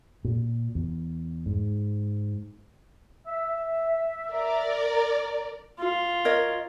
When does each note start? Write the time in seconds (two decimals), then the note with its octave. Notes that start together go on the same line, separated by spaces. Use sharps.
0.25 A#2
0.75 E2
1.46 G#2
3.27 E5
4.32 A#4 D5
5.79 F4
6.25 A#4 C#5 D#5